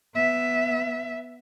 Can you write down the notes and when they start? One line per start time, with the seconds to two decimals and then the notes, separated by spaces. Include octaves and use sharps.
0.15 B3 E5